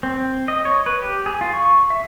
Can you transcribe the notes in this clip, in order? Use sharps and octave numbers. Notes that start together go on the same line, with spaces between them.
C4
D#5
C#5
B4
G4
G#4
F4
C#6
E5